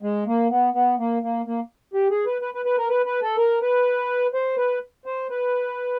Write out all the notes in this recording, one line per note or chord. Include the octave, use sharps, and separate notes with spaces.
G#3
A#3
B3
B3
A#3
A#3
A#3
G4
G#4
B4
B4
B4
B4
A#4
B4
B4
A4
A#4
B4
C5
B4
C5
B4